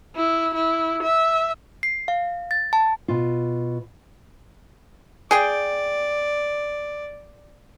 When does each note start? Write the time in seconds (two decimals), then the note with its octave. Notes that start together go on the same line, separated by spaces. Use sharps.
0.16 E4
0.54 E4
1.03 E5
1.83 C7
2.08 F5
2.51 A6
2.73 A5
3.08 B2 F4
5.31 G#4 D5 G5